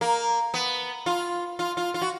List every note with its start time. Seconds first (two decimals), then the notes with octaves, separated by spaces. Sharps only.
0.01 A#3
0.54 B3
1.06 F4
1.59 F4
1.77 F4
1.94 F4
2.02 F#4